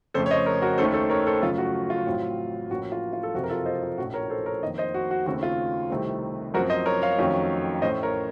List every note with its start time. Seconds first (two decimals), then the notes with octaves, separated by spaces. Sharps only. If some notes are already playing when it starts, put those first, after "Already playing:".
0.14 F2 C#3 A3 A4 C5
0.26 C#5
0.31 C5 D#5
0.46 A#4 C#5
0.62 F#4 A#4
0.78 D#2 D#3 A3 C#4 A4 C5
0.94 A4 C5
1.10 A#4 C#5
1.27 A4 C5
1.42 F#2 C#3 F3 A3 F4 A4
1.58 F#4
1.90 F4
2.06 A1 A2 F#3 C4
2.70 A1 A2 F3 A#3 C#4 F#4
2.92 F4
3.13 F4
3.23 A4
3.34 F#1 F2 C3 F#4
3.44 A#4
3.50 F4 A4
3.66 C5 D#5
3.83 F4
3.98 A#1 A2 A3 C#4 F#4
4.14 A#4 C#5
4.30 A4 C5
4.46 A#4 C#5
4.62 F2 D#3 A#3 C5 D#5
4.78 C5 D#5
4.94 F#4
5.11 F#4
5.26 D#2 C#3 A3 C4 F#4
5.43 F4
5.90 C2 C3 D#3 A3 C4
6.54 F#2 F3 C4 F#4 A#4
6.70 C5 D#5
6.86 A#4 C#5
7.02 C#5 F5
7.18 F2 D#3 F#3 A3 C#4
7.82 A1 A2 A3 C#4 C5 D#5
8.03 A#4 C#5